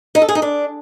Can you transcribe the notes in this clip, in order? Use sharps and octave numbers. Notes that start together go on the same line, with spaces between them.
D#4
A4
G#4
D#4
D4